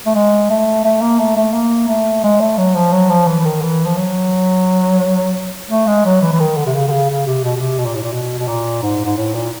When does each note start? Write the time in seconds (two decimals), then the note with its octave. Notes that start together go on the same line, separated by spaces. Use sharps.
0.06 A3
0.15 G#3
0.50 A3
0.84 A3
1.01 A#3
1.19 A3
1.36 A3
1.53 A#3
1.88 A3
2.23 G#3
2.40 A3
2.57 F#3
2.75 F3
2.92 F#3
3.10 F3
3.27 E3
3.39 E3
3.45 D#3
3.62 E3
3.86 F3
3.97 F#3
5.70 A3
5.87 G#3
6.05 F#3
6.21 E3
6.32 E3
6.39 D#3
6.57 D3
6.66 C3
6.74 C#3
6.87 D3
6.91 C#3
7.09 C#3
7.26 C3
7.44 B2
7.56 B2
7.60 C3
7.78 B2
7.86 A#2
7.95 A2
8.03 A#2
8.12 B2
8.39 B2
8.47 A#2
8.82 G#2
9.05 G#2
9.17 A2
9.35 A#2